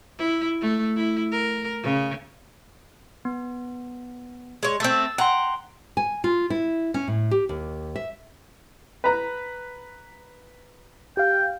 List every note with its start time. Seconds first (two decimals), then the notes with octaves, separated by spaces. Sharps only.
0.18 E4
0.61 A3
0.96 E4
1.32 A#4
1.83 C#3
3.25 B3
4.63 G#3 C#5
4.80 A3 C4 E6 A6
5.18 F#5 G5 A#5 C6
5.97 G#5
6.24 F4
6.50 E4
6.94 C#4
7.08 A2
7.31 G4
7.49 D#2
7.96 E5
9.04 B4 A#5
11.17 G4 F5 G5